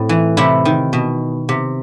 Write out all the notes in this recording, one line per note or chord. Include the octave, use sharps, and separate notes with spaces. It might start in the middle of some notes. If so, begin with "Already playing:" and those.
Already playing: A2 C4
E3
C3 E4
D#3
B2
C3